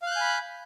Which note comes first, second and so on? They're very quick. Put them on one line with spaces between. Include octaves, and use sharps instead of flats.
F5 F#6 G6 G#5 B5